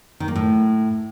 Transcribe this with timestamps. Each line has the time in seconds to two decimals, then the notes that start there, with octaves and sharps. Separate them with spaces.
0.20 D#3
0.28 A#3
0.36 A2